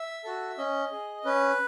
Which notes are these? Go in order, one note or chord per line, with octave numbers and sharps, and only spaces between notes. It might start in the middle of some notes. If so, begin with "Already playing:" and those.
Already playing: E5
F#4 A4
C#4 D#5
G#4
C#4 B4